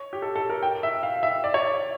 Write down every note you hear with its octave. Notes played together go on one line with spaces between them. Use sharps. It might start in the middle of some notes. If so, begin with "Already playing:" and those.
Already playing: C#5
G4
A4
A4
A#4
G5
E5
F5
E5
D5
C#5